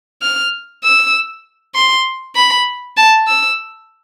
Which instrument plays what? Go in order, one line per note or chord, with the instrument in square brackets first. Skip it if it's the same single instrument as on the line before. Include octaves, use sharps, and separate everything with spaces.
[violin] F6
E6
C6
B5
A5
E6